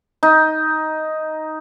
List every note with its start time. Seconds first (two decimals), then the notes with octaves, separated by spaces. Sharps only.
0.23 D#4